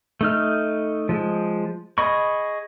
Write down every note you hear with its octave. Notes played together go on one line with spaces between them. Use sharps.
A3 D#4 F6
F3 G#3
G#4 D#5 B5 C#6